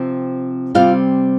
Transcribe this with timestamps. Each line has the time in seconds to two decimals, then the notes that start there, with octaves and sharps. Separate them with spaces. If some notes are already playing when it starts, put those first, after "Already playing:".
Already playing: C3 F3 C4
0.75 C3 G3 C4 F4 F5